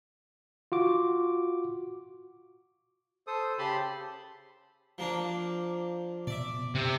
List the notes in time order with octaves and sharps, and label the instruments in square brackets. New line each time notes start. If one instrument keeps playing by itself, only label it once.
[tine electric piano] F4 F#4 D6
[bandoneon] A4 C5 D#6
C#3 G4 A5 B5 C6
[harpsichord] F3 A#3 D4
[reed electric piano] B2 [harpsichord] D5 E5
[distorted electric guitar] C3